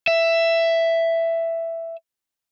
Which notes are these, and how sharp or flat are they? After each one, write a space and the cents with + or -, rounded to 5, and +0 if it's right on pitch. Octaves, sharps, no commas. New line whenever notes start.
E5 +10